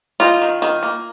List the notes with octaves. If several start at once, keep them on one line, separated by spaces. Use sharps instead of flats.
D#4 F4
D#3
D#3
A#3